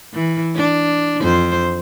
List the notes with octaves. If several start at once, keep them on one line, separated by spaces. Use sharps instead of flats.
E3
D4
F2 C5